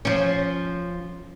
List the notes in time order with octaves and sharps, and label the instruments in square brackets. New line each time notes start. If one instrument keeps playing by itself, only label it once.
[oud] F3 C#4